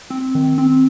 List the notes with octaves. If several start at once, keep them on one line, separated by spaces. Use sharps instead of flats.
C4
D#3
C4